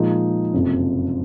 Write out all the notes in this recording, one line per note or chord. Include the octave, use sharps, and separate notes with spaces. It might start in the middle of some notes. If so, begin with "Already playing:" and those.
Already playing: A#2 F3 G#3 D#4
F#1 F2 C3